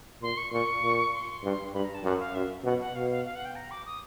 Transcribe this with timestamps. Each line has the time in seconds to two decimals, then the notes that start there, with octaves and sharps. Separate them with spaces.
0.22 A#2 C6
0.37 C#6
0.52 A#2 C#6
0.83 A#2
1.13 C6
1.43 G2
1.74 G2 B5
1.84 A#5
1.94 A5
2.04 F#2 F#5
2.19 F5
2.34 F#2 E5
2.64 B2 F#5
2.79 F#5
2.95 B2 F5
3.10 F5
3.25 F5
3.35 F#5
3.45 G5
3.55 A#5
3.71 D6
3.85 D#6